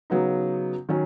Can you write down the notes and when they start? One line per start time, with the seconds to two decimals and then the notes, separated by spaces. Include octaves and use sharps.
0.10 C#3 F#3 B3 D#4
0.89 D#3 F#3 C#4